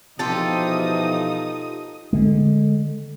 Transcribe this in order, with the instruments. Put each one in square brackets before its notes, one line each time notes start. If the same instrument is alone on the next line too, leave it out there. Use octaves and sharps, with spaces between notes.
[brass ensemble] B2 E3 F3 [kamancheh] D#4 D#6 [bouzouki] F4 G4 A4
[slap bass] D3 G#3